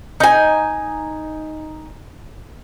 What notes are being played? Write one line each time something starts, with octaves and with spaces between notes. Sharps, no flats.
D#4 G#5